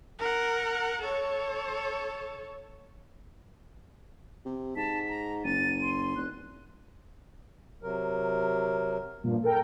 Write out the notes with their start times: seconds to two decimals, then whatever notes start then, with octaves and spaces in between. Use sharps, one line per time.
0.19 A#4 F#5
1.01 A4 C#5
4.45 C3
4.76 G#2 A5 B6
5.09 A#5
5.45 F#1 A6 D#7
5.82 C6
6.16 F1 F#6
7.83 C3 F#3 A#4
9.24 G2 A#2 F3
9.43 A4 A#4 G5